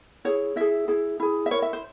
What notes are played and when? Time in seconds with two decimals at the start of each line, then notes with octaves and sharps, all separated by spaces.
0.25 E4 G#4 C#5
0.56 E4 G#4 E5
0.88 E4 G#4
1.20 E4 G#4
1.46 E5
1.51 E4 A#4 C#5
1.62 E5
1.73 C5